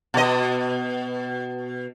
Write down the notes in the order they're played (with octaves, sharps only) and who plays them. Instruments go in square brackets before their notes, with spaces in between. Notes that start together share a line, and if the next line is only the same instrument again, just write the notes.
[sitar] B2 D#5